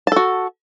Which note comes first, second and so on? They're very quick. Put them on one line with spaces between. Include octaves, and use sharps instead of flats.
A5 A4 F#4